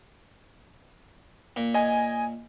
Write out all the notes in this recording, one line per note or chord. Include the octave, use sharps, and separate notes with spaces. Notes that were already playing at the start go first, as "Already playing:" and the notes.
A#2
D#5 G#5